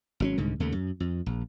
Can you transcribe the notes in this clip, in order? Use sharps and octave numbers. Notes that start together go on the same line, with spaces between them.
G#1 F#3 C#4
C2 G#2 D3
D#2 C#3 A3
F#2
F2
A#1